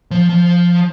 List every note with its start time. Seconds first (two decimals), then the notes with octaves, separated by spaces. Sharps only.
0.11 F3
0.30 F3